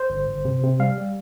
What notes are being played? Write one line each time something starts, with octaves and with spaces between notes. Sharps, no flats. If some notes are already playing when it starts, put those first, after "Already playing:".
Already playing: C5
G1
G1
C3
C3
G3 F5
G3